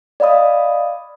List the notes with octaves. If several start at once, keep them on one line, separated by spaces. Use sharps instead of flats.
D5 D#5 F5 B5 D#6